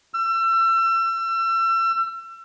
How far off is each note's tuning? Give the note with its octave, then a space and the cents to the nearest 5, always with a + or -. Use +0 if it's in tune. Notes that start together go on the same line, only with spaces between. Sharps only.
E6 +35